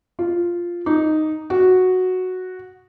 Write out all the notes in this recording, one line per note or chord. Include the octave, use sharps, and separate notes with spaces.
F4
D#4
F#4